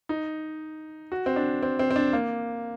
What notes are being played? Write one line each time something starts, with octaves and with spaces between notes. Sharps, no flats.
D#4
F#4
C4
D4
C4
C4
C4
D4
A#3